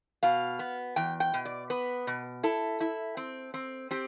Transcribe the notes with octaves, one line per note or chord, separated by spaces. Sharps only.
B2 F5
B3
E2 G5
G5
B2
D5
B3 B4
B2
E4 A4
E4
C4
C4
C4 G4